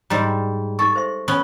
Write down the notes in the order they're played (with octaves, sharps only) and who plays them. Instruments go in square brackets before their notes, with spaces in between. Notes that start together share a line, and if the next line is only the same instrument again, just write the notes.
[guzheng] G#2 G3 [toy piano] A#5
[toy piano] D#4 G#4 C#6 [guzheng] A4
[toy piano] C5 E5 C6
[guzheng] B3 C#4